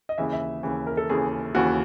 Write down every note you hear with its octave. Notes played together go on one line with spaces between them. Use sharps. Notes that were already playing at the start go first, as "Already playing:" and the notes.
D#5
D#2 C#3 E3 E5
E5
D#2 C#3 E3
A#4
A4
D#2 C#3 E3 G#4
D#2 C#3 E3 F#4